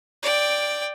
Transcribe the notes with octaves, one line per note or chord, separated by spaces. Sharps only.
D5 G5